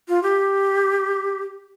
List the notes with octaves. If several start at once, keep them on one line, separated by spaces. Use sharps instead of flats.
F4
G4